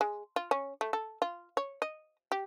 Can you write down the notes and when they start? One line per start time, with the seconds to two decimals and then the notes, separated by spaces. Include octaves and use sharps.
0.01 G#3
0.36 F4
0.51 C#4
0.81 A3
0.93 A4
1.22 F4
1.57 C#5
1.82 D#5
2.32 G4